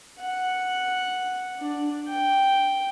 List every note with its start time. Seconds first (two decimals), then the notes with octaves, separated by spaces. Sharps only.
0.19 F#5
1.59 D4
2.09 G5